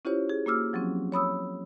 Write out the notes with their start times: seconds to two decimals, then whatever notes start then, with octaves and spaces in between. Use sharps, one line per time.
0.05 C#4 E4 F4 G4 C5 C#5
0.29 G#4
0.46 A#3 F#4 D6 E6 F6
0.73 F3 F#3 C4 C#4
1.12 C#5 B5 D#6 E6